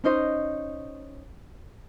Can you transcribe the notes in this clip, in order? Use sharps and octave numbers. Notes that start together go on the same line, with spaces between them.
C#4 D#4 C5 D#5